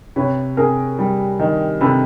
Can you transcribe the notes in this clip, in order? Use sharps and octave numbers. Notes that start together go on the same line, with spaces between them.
C3 B4 C#5
C3 G#4 A#4
G3
D#3
C3 A4 B4